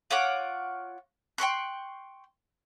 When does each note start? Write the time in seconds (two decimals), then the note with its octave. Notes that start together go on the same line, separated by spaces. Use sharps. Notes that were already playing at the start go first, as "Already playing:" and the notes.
0.10 F4 C#5 F#5 D6
1.38 G5 C6 C#6 F#6